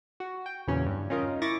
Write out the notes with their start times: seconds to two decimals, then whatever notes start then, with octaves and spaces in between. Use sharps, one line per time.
0.20 F#4
0.46 G5
0.67 E2 A#2 C#3 E3 F#3 C#4
0.86 G2
1.10 C#4 D#4 F4 A#4 D#5
1.42 E4 C#6 D6 A6 A#6